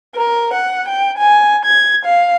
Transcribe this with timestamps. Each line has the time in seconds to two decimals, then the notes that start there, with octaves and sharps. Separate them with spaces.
0.16 A#4
0.54 F#5
0.88 G5
1.18 G#5
1.65 G#6
2.05 F5